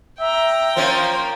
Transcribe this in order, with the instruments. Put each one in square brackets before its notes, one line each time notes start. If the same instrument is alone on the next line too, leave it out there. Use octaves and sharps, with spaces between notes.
[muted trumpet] E5 [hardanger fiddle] G5 A#5
[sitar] F3 A#3 C#4 [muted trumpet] C5